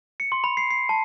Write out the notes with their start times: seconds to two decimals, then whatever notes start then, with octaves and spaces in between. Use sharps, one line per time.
0.20 C#7
0.32 C6
0.44 B5
0.57 C7
0.70 C7
0.89 A5